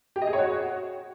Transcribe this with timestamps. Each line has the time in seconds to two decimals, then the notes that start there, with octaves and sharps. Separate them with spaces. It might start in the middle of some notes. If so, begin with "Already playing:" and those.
0.16 G4
0.22 D#5
0.27 G#4
0.33 C#5
0.39 F#4